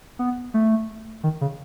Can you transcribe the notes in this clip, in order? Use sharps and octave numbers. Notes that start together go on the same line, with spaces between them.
B3
A3
D#3
C#3